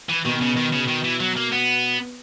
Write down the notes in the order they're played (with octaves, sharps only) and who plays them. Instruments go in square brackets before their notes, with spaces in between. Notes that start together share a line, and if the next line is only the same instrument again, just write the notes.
[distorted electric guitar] E3
[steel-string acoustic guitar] B2 [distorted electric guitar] D#3
[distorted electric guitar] C#3
D#3
C#3
D#3
E3
F#3
A#3
B3